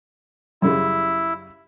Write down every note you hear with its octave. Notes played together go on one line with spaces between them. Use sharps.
F#2 C#3 G3 E4